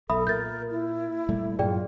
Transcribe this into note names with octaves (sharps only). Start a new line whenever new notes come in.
B1 A4 E5 B5 D#6
A#2 A#4 G6 A6
E4
A#2 G3 A3
G2 A#2 F#3 F4 G#4 D5 G5